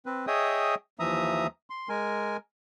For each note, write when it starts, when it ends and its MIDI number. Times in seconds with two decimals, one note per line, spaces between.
0.06 0.26 60
0.06 0.26 71
0.27 0.75 68
0.27 0.75 73
0.27 0.75 75
0.27 0.75 76
0.27 0.75 79
0.27 0.75 87
0.99 1.47 39
0.99 1.47 52
0.99 1.47 53
0.99 1.47 76
0.99 1.47 82
0.99 1.47 87
1.70 1.89 84
1.89 2.37 56
1.89 2.37 70
1.89 2.37 80